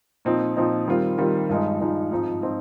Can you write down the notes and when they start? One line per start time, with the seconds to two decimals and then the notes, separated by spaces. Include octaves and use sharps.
0.25 A#2 F3 C4 D#4
0.57 A#2 F3 C4 D#4
0.87 D#3 G3 C4 F4
1.18 D#3 G3 C4 F4
1.49 G2 F3 G#3 D#4
1.80 G2 F3 G#3 D#4
2.11 G#2 F3 C4 D#4
2.42 F3 C4 D#4